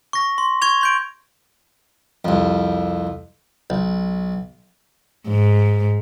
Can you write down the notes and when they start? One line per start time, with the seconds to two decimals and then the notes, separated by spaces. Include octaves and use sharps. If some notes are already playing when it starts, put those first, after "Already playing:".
0.13 C#6 A#6
0.38 C6
0.62 C#6 G#6 F7
0.81 C6 G6 D7
2.25 C2 F2
3.70 B1
5.28 G#2